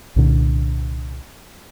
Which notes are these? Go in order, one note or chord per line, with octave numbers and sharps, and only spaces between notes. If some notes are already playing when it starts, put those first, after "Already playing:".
C2 A#2 D3